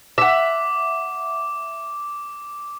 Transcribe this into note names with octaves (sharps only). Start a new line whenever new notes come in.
E5 F#5 D6